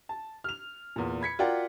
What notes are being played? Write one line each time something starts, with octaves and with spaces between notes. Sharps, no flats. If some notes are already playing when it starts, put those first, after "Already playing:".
A5
F6 F7
E2 A#2
B5 G#6 B6 C#7
F4 F#4 A#4 D5 F#5 G5